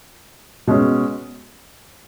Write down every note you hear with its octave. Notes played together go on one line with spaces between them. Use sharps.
B2 G#3 C#4